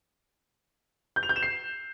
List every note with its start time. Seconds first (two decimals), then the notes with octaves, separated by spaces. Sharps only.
1.16 G6
1.23 F7
1.29 G6
1.36 E7
1.43 C7